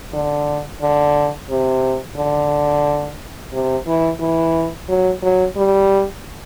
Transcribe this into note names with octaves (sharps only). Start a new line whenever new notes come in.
D3
D3
C3
D3
C3
E3
E3
F#3
F#3
G3